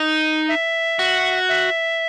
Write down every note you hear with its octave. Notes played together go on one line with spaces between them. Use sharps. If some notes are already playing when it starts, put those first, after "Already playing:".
Already playing: D#4
E5
F#4
E5